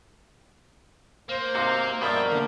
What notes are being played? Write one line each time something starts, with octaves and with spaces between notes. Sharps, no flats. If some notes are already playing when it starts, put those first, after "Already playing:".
A#3 C5
G#2 C3 F#4 F5
G2 B2 F3 A#4 D5 E5 G5
D3